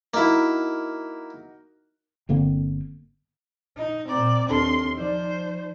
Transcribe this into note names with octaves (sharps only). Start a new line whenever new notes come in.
A#3 D#4 E4 F#4 A#4
G1 D3 A#3 C4
D#4
A#2 C4 D5 A#5
D#2 C4 D4 A4 C6
F3 D#4 C5 D5